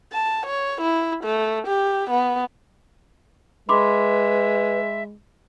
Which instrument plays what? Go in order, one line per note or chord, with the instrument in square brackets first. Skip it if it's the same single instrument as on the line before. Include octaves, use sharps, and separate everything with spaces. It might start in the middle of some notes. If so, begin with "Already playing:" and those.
[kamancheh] A5
C#5
E4
A3
G4
B3
[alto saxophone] G#3 [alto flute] B4 [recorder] E5 [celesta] B5 C6 D6